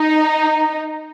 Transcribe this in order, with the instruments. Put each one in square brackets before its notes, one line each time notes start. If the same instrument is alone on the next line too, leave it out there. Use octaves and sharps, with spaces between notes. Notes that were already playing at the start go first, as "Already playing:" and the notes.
Already playing: [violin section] D#4